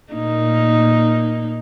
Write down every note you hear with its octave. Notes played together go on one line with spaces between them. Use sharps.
A#2 A#3 D#4